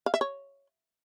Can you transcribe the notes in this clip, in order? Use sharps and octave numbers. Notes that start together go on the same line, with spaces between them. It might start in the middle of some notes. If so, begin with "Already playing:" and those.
F5
E5
C#5